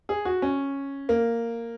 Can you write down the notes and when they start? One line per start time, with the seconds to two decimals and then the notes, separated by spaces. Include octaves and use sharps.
0.09 G#4
0.25 F#4
0.42 C#4
1.09 A#3